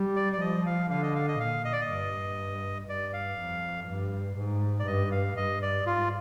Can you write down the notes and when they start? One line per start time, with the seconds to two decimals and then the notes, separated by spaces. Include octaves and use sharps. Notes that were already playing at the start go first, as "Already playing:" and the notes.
Already playing: G3
0.16 D5
0.33 D5
0.40 F3 D#5
0.66 F5
0.90 D3 F5
1.03 D#5
1.15 F5
1.28 D#5
1.40 A#2 F5
1.65 D#5
1.73 D5
1.81 D#5
1.90 G2
2.89 G2 D5
3.13 F5
3.38 F2
3.88 G2
4.37 G#2
4.80 D5
4.87 G2 D#5
5.12 F5
5.37 G2 D#5
5.62 D5
5.86 G#2 F4